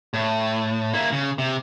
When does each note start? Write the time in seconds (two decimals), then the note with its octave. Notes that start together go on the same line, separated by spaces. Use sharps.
0.14 A2
0.93 A#3 E4
1.12 C#3
1.38 C3